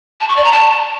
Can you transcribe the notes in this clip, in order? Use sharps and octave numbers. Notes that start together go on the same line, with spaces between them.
A5
C#6
D5
A#5
A5